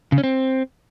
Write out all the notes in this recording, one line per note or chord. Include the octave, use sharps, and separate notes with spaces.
C#3
C#4
C4